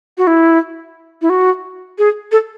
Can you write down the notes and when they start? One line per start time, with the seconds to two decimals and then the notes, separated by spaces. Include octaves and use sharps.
0.18 F#4
0.27 E4
1.22 E4
1.30 F#4
1.98 G#4
2.32 A4